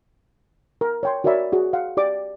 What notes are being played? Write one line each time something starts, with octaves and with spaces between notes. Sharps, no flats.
A#4
C#5 G5 C6
F#4 A#4 C#5 D5 E5 B5
F#4 G#4
F5 F#5
G4 D5 D6